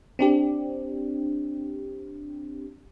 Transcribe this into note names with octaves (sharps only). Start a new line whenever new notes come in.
C4 D4 G4